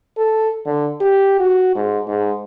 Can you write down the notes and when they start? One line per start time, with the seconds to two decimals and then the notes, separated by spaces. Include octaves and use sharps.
0.18 A4
0.66 D3
1.00 G4
1.39 F#4
1.76 G#2
2.07 G#2